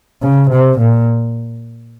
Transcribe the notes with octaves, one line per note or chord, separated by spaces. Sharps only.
C#3
C3
A#2